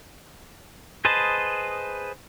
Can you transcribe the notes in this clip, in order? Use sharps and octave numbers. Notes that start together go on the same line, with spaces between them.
G#4 B4 C5 D#5 A5